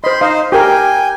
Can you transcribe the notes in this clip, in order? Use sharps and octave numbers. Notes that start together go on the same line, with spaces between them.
C5 D#5 B5 C6
D#4 C5 D#5 F5 C6
G4 A#4 G5 G#5